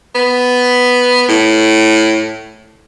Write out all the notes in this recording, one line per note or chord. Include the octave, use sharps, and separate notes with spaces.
B3
A2